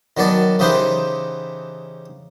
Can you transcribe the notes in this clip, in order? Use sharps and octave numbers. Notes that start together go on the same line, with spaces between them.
D#3 F#3 B3 D5 A5
C#3 E3 D#4 G4 B4 C5